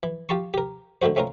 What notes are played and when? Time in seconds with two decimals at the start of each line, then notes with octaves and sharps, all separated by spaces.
0.03 E3
0.29 F4 G4 A5 C6 C#6
0.54 G4 A#4
1.02 D3 D#3 A3 F#4 C5
1.16 A3 C4 C#4 F4 A#4